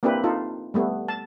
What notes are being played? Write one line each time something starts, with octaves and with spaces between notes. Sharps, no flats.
A#3 C4 D4 E4 G4 B4
D#4 F4 A4
G3 A3 B3
A5